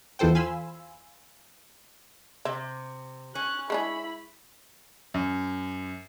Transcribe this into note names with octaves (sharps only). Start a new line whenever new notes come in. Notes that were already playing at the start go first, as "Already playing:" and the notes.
E2 E3 F4 A4 C5 G5
F5 G#5 B5 C6 E6
C3 E5
C#4 F#6
G#3 D4 E4 G#4 B5
F#2